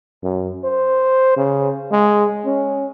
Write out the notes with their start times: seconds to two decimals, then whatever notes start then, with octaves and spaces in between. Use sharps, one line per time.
0.23 F#2
0.64 C5
1.37 C#3
1.91 G#3
2.45 C#4